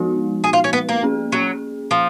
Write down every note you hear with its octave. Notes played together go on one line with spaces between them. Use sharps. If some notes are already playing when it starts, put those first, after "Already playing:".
Already playing: F3 G#3 B3 D#4 F#4
G#4
F4
C#4
B3
A#3
A#3 C#4 G#4
F#3
F3